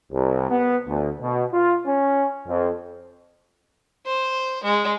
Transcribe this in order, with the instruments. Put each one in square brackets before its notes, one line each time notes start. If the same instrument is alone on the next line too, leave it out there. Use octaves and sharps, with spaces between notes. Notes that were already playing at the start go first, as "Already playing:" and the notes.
[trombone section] C2
B3
D2
B2
F4
C#4
F2
[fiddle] C5
G#3